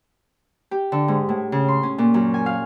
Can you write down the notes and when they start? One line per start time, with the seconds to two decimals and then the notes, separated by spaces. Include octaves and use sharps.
0.71 G4
0.92 D3
1.08 G#2
1.29 A2
1.52 C#3
1.68 C6
1.83 C#4
1.98 A#2
2.14 F#2
2.34 G#5
2.46 F5